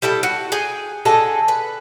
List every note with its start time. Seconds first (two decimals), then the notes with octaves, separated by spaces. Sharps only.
0.02 G3 E4 A4 G5
0.23 F#4
0.52 G#4 G5 G#5
1.05 D3 G#4 A4 D#5
1.48 B4